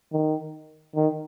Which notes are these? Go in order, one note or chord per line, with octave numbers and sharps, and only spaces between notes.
D#3
D#3